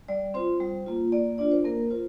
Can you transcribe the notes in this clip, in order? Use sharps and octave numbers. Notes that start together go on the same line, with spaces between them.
G3 D5
C4 F4 C5
G3
A#3 F4
A#3 D5
D4 F4 D5
C5
A#3 A#4
F4 C5